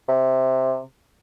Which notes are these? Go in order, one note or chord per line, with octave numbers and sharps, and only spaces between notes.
C3